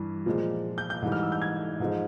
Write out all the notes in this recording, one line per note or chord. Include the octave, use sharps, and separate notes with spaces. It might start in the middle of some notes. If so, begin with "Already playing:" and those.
Already playing: G2 E3 G3
A#2 F3 G#3
G6
G6
G#2 E3 G3
F6
E6
G6
G#6
G#2 F3 G#3